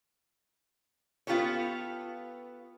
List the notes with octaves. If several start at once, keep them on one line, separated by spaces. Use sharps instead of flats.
B3 F4 G4 A4 C#5